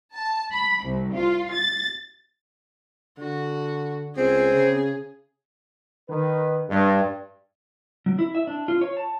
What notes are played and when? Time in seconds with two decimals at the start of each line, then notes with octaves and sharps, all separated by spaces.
0.14 A5
0.51 B5
0.84 C2
1.14 F4
1.51 A6
3.19 D3 F#4
4.17 C#2 C4 G#4
4.51 C#3
6.09 D#3 B4
6.69 G2
8.06 F#3
8.19 E4
8.35 E5
8.47 D4
8.68 F4
8.81 C#5
8.97 A5